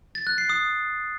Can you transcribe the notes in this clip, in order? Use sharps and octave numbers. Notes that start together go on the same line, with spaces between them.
A6
F#6
C7
D#6